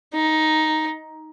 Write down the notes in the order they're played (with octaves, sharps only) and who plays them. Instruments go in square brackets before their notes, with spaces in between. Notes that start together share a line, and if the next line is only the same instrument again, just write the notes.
[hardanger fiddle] D#4